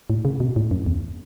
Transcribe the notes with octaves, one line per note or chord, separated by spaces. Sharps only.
A2
C#3
B2
A2
F#2
E2